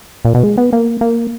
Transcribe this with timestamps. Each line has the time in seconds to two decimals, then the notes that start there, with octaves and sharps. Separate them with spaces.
0.25 A#2
0.35 B2
0.43 G#3
0.58 B3
0.73 A#3
1.01 A#3